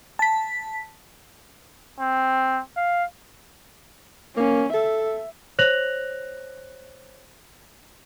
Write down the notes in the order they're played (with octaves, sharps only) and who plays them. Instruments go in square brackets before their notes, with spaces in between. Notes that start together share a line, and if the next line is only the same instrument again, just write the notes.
[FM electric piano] A5 B6
[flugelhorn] C4
F5
[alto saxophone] A#3 [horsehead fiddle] C#4
[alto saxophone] A4 [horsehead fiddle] E5
[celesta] C5 C#5 F#6 A#6 F7 F#7